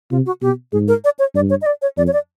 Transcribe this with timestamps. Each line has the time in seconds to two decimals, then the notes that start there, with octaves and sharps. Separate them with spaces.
0.11 C3 F4
0.26 F#4
0.42 B2 G4
0.72 G#2 G#4
0.88 A#4
1.04 D5
1.19 C#5
1.35 G2 D5
1.50 C#5
1.62 D#5
1.66 D5
1.82 C#5
1.97 F2 D5
2.07 C#5
2.13 D5